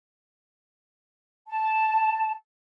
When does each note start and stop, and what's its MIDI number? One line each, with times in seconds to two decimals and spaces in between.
1.48 2.31 81